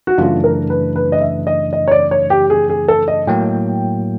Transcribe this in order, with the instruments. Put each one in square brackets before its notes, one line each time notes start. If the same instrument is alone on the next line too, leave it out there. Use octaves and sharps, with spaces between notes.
[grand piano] F#4
[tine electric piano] F#2 C#3 E3 A3 D4 [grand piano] F4
[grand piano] A#4
B4
B4
D#5
E5
D#5
D#5
C#5
D5
C#5
G4
G#4
G#4
A4
D#5
[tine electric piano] A2 F#3 A#3 [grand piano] G5